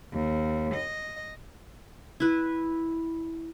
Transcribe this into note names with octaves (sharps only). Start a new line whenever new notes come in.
D#2
D#5
E4 B4